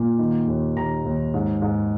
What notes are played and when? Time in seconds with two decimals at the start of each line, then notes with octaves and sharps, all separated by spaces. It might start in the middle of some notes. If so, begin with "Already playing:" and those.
Already playing: A#2
0.18 D#3
0.47 D#2
0.76 D#2 A#5
1.05 D#2
1.34 G#2
1.62 G#2